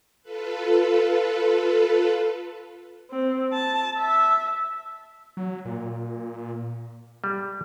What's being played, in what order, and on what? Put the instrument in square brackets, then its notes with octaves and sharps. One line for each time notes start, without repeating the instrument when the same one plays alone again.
[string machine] F4 A4 B4
[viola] C4
A5
E5
[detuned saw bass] F#3
A#2
[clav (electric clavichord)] G3